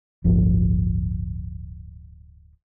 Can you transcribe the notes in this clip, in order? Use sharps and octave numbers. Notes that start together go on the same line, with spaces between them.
D1 G1 F3